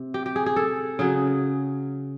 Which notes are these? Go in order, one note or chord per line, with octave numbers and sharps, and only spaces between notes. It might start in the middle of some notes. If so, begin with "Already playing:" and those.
Already playing: C3
G4
G4
G#4
G#4
A4
C#3 F#3 G#4